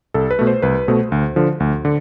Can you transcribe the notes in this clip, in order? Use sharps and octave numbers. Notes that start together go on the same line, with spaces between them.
C2 A4
B4
B2 A3
C5
C2 B4
B2 A3 C5
D2
D3 F3
D2
D3